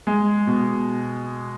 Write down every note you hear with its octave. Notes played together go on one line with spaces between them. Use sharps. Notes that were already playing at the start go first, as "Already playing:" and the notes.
G#3
B2